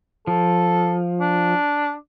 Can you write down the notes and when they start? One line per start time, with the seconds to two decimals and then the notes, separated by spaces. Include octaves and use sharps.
0.27 F3 A4
1.21 D4